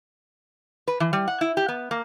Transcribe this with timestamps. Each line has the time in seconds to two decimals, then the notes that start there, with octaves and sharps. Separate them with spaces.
0.88 B4
1.00 E3
1.13 G3
1.28 F#5
1.41 E4
1.57 G4
1.69 B3
1.91 A#3